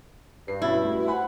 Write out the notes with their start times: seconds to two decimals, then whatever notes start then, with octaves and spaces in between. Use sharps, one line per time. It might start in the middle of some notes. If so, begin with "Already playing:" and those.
0.48 G2 C7
0.62 B2 C#4 E4 A6
0.84 A3 F#4
1.08 C5 F#5 G#5 B5